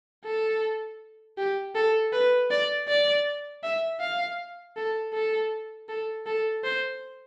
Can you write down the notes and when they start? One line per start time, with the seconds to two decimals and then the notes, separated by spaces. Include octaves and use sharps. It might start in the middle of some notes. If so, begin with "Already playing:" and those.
0.25 A4
1.38 G4
1.75 A4
2.13 B4
2.51 D5
2.88 D5
3.64 E5
4.00 F5
4.77 A4
5.13 A4
5.89 A4
6.26 A4
6.64 C5